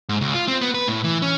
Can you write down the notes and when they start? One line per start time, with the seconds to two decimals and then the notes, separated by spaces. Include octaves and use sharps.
0.09 G#2
0.21 C#2
0.34 F4
0.48 C4
0.61 B3
0.74 B4
0.88 A2
1.04 E3
1.22 C#4